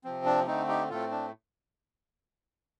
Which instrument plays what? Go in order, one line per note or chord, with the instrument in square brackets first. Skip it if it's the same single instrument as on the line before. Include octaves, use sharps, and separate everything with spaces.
[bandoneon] C3 F3 C4
D4
D3 A3 C4 D#4
D#4 G4
A2 A3 C4 F4 A4
D4